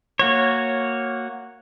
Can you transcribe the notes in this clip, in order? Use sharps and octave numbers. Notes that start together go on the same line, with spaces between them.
A#3 F#4 C#5